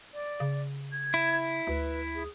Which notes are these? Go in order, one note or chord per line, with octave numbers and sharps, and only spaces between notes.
D5
C#3
G#6
E4
D2 B4
G#4